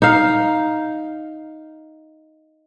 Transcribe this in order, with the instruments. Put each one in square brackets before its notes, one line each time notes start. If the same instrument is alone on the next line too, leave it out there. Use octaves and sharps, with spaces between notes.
[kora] D#4 F5